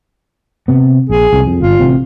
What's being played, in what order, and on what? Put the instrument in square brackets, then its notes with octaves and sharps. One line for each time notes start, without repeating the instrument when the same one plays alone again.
[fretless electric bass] C3 B3
[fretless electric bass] A#1 [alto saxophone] G#4
[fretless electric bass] C2
F2
[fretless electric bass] G1 [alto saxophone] F4
[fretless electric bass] A1 C3 C4